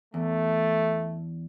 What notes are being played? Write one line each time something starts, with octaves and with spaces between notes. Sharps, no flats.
E2 A3